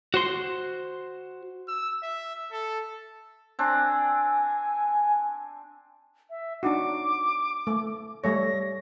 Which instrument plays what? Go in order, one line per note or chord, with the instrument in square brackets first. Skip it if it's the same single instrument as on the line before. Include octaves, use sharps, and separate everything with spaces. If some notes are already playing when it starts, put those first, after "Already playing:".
[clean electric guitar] F#4 C5 C6
[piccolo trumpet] E6
E5
A4
[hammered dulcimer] C4 D4 [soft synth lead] G#5
[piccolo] E5
[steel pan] D4 D#4 F#4 [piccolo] D6
[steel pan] A3
[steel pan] G3 A3 C#5 [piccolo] A#6